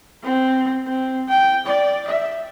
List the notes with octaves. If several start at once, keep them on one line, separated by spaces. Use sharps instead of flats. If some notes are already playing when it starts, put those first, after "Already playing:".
C4
C4
G5
D5
E5